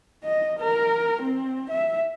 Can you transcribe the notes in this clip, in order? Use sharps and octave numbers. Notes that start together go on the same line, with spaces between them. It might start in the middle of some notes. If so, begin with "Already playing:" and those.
D#5
A#4
C4
E5